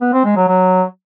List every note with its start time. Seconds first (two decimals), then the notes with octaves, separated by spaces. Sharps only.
0.01 B3
0.13 C4
0.24 G#3
0.36 F#3
0.48 F#3